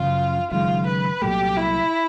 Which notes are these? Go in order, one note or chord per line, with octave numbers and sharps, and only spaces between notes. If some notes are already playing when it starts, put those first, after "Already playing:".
Already playing: F#1 F#2 C#3 F3 F4
F#1 F#2 D#3 G#3 F4
B4
C2 A#2 F#3 A3 G4
E4